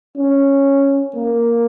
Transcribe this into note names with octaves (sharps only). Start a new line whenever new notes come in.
C#4
A#3